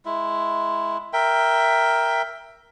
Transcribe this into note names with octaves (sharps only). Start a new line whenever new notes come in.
G#3 E4
A#4 E5 G5